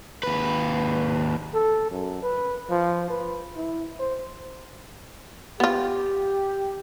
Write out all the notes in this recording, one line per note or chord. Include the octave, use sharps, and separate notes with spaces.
D#2 B4
A4
F#2
B4
F3
B4
E4
C5
B3 F4 G4